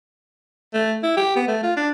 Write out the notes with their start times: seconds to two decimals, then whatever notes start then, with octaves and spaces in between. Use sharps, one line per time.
0.74 A3
1.03 E4
1.17 G4
1.36 B3
1.48 A3
1.63 F4
1.77 D4